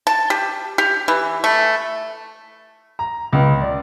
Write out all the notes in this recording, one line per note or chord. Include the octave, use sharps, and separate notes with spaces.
A5
G4
G4
E3
A3
A#5
C#2
D5